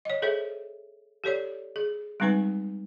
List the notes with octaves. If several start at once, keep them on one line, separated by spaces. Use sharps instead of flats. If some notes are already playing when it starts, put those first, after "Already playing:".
C#5 D#5
G#4 A4 C5 C#5 E5
G4 A4 C#5 D5
G#4
G3 G#3 C4 D#4 B4 G#5